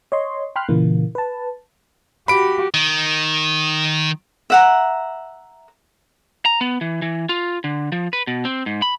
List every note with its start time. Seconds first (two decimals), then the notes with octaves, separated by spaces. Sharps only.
0.12 C#5 D#5 C6
0.56 G5 B5 C6 F6 F#6
0.69 A#2 C#3 E3 A#3
1.15 B4 A5
2.28 F#4 G4 B5 D7
2.74 D#3
4.50 E5 F#5 A#5
6.46 A#5
6.61 B3
6.81 E3
7.02 E3
7.29 F4
7.64 D3
7.92 F3
8.13 B4
8.27 B2
8.45 C4
8.66 G#2
8.82 B5